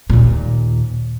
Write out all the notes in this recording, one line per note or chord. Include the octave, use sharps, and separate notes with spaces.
D#2 A#2